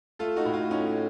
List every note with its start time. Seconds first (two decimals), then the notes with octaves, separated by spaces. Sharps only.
0.19 A3 F4 A4
0.36 D#4 F#4
0.45 A2
0.54 F4
0.71 C#4 D#4